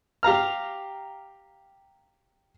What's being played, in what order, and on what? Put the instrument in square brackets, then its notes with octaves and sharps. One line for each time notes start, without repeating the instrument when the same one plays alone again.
[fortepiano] G4 F5 A#5 F6